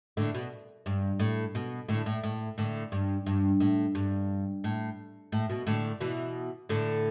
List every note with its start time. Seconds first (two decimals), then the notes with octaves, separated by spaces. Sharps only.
0.17 A2 D3
0.34 B2
0.86 G2
1.19 A2
1.55 B2
1.88 A2 D3
2.06 A2
2.23 A2
2.58 A2 D3
2.92 G2
3.26 G2
3.60 A2
3.95 G2
4.64 A2
5.32 A2
5.49 B2
5.66 A2 D3
6.01 B2 E3
6.69 A2 D3